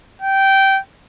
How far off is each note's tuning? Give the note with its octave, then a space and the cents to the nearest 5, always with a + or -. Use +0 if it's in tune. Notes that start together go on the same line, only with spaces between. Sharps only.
G5 -15